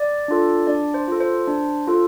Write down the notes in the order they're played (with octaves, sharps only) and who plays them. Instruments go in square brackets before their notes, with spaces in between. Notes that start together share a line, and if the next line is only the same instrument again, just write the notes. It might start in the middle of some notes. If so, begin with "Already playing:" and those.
Already playing: [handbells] D5
D4 F4 A4
D4 D5
C5
F4 A4
C5
D4
F4 A4